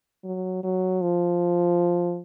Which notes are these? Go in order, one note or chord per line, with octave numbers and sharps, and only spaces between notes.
F#3
F#3
F3